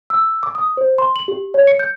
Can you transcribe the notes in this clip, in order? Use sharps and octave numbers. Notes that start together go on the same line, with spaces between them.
E6
D6
D#6
C5
C6
F#7
G4
C#5
C#7
G6